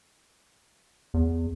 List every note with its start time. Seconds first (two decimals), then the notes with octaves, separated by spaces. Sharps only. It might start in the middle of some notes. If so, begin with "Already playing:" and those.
1.14 E2